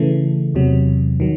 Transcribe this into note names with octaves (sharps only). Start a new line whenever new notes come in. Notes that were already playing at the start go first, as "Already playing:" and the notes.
Already playing: C#3 E3 A3
E2 C3 F#3
D#3 F#3